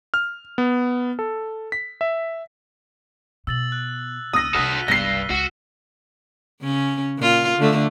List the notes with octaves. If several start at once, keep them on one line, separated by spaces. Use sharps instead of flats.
F6
B3
A4
B6
E5
B2 E6 A6 F#7
F#6
C#2 D#6 E6 A#6 D#7
C2 D4 F#4 A4 F6 F#6 B6
F#1 C2 G2 A#6 C7 G7
C#2 F#4 E6 E7
C#3 C#4
A#2 F4
D3 A3